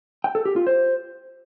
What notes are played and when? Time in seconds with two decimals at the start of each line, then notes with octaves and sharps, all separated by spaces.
0.24 G5
0.35 A4
0.45 G4
0.56 F4
0.67 C5